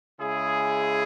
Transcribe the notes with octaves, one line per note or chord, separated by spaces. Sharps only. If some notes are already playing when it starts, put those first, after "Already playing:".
C#3 G#3 E4 G#4